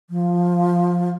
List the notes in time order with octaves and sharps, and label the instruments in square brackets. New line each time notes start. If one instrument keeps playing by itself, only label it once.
[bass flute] F3